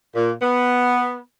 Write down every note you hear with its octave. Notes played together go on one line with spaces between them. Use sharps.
A#2
B3